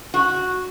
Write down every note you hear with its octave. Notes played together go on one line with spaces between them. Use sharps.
F#4